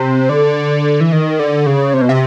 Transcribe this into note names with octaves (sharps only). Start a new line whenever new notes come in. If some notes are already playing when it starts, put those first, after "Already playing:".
Already playing: C3
D3
E3
D#3
D3
C#3
C3
B2
C3